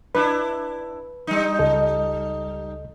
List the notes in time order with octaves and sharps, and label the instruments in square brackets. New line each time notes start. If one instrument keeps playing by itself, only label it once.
[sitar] D4 E4 [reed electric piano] B4
[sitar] G3 D#4
[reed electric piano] C#2 A4 D#5